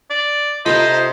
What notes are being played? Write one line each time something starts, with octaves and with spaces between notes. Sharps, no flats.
D5
C3 D#4 F4 A4 A#4 C5 D#5 B5